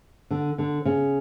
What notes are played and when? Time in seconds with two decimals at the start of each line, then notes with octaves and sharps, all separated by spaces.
0.31 D3
0.58 D3
0.85 C#3